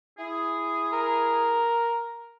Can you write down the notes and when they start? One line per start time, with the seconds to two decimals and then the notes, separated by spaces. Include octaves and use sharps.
0.19 E4 G#4
0.93 A#4